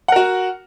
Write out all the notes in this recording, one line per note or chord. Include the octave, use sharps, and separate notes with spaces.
F#4 A#4 F#5